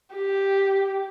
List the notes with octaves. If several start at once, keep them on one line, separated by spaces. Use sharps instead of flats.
G4